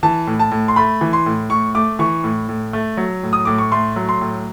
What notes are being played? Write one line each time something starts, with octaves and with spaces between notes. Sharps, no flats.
E3 A5
A2
A5
A2
C6
A3 B5
E3
C6
A2
A2 C#6
A3 D6
E3 C#6
A2
A2
A3
F#3
A2
D#6
A2 D6
C#6
A3 C6
F#3
C6
A2